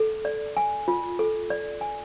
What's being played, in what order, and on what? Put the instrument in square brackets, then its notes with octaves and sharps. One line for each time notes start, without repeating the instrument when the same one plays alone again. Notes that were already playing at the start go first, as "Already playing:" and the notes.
Already playing: [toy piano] A4
D5
G#5
F4
A4
D5
G#5